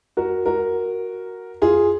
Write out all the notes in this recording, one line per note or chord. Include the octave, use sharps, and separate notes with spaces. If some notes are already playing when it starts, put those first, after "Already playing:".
F#4 A#4
F#4 A#4
F4 G#4